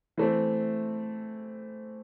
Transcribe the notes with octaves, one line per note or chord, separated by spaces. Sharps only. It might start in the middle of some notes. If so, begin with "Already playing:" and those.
E3 A3 C4